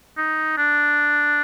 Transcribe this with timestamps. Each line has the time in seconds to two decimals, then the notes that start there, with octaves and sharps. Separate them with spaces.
0.17 D#4
0.58 D4